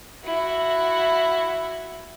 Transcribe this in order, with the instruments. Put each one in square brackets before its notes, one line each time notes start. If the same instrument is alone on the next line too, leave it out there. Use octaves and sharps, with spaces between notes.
[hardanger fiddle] E4 F#4